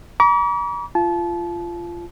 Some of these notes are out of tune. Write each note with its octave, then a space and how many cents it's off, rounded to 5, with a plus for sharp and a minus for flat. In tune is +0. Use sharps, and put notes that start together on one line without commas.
A#5 +45 D6 -40
F4 -20 A5 -30